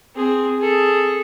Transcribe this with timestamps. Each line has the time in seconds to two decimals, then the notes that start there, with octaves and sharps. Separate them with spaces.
0.15 C4 G#4
0.59 G#4 A4